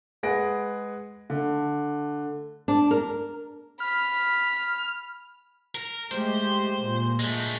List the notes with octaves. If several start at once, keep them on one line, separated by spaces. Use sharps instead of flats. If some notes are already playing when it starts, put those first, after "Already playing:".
G#3 G#4 B4 F#5 A#6 D7
D3 A3
D4
A#4
B5 F6
A#4
G#3 A3 G4 C5
A#2
G#3 A3